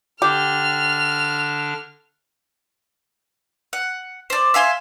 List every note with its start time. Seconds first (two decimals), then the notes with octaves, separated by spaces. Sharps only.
0.22 D3 D4 G4 F6
3.73 F#5
4.30 C5 D5
4.54 E5 F5 G#5 C6